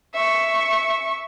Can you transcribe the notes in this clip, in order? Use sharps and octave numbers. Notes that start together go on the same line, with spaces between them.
E5 C#6